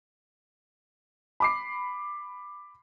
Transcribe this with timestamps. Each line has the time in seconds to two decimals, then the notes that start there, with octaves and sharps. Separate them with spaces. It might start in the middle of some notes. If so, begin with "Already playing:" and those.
1.40 B5 D6 C7